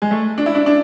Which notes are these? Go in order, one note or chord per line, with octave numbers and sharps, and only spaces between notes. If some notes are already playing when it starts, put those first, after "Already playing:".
G#3
A3
D4
E4
D4
D4